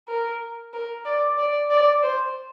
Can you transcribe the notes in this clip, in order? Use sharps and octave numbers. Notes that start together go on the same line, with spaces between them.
A#4
A#4
D5
D5
D5
C5